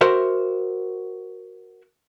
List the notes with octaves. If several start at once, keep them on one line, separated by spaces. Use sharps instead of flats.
F#4 A#4 C5 E5